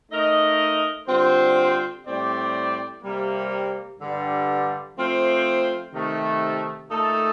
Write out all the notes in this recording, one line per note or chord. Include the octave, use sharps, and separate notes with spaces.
A3 D#4 A#4 D#5
D3 G3 C4 F4 C5
A2 G3 C4 G4 D5
C3 G3 A#3
G2 D3 G3
F3 A3 C4 F4 C5
C3 D#3 A3
A#2 A3 D#4 A4